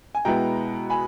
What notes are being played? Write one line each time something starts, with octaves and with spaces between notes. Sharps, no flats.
G#5
B2 G#3 B3 E4 G5 A#5
G#5 B5